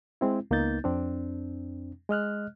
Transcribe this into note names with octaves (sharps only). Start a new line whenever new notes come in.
G#3 C4 E4
C#2 A#3 B3 D#4 G6 A6
F2 C4 D4
G#3 D#5 F6 F#6